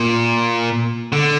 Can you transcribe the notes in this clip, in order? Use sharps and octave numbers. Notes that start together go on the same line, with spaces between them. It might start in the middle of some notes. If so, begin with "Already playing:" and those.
Already playing: A#2
D3